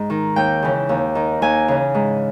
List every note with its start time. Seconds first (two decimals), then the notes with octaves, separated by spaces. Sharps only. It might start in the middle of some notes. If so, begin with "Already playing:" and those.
Already playing: G#2 D#5
0.10 D#3
0.36 D#2 G5
0.63 C#3 E3
0.89 D#2
1.15 D#3
1.42 D#2 G#5
1.68 C#3 E3
1.94 G#2